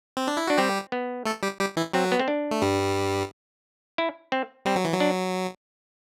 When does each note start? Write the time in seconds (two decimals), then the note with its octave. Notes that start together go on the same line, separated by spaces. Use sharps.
0.17 C4
0.27 D4
0.37 E4
0.47 D4 F#4
0.58 G3 C4 G4
0.92 B3
1.25 A3 A4
1.43 G3 G4
1.60 G3 G4
1.77 E3 E4
1.93 F#3 C4 F#4
2.12 B3
2.19 C4
2.28 D4
2.51 A3
2.62 G2 G3
3.98 E4
4.32 C4
4.65 G3 C4
4.76 F#3
4.85 E3
4.94 F#3
5.00 D4